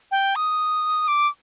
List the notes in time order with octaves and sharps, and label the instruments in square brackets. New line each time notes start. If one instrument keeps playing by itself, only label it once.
[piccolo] G5
D#6
D6